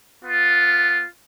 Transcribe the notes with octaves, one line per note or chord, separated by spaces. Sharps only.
B3 F4